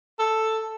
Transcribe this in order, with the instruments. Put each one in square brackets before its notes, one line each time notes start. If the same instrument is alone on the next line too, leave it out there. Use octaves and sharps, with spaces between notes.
[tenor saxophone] A4